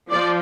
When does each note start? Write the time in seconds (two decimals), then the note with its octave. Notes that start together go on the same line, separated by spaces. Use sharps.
0.11 F3 D5